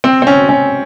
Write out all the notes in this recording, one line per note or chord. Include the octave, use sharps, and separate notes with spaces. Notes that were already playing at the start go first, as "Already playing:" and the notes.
C4
C4
C#4
C#4